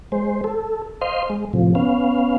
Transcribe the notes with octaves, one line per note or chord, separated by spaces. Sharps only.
G#3 C5
A4
C5 D#5 F5 C6
G#3
A2 C3 F3
B3 C#4 F5